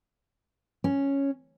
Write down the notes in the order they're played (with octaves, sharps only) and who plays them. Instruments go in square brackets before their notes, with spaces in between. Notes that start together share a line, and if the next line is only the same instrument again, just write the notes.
[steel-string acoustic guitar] C#4